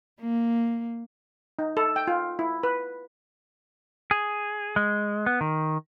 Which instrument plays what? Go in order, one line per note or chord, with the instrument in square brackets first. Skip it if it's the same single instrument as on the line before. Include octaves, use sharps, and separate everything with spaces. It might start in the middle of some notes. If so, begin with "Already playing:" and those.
[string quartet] A#3
[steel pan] D#4
A4
G5
F4
E4
B4
[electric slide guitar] G#4
G#3
B3
D#3